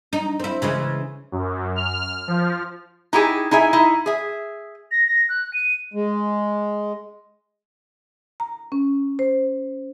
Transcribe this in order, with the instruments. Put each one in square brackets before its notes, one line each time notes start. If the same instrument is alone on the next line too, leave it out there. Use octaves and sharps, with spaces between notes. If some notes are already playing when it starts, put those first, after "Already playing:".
[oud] D#4
C4 E4
C#3 E3 G#3
[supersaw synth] F#2
F6
F3
[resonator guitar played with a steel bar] D#4 E4 G4 G#4
D#4 E4 G#4 E5
D#4 E4
G#4 E5
[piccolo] A#6
A#6
F#6
D#7
[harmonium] G#3
[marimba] A#5
C#4
C5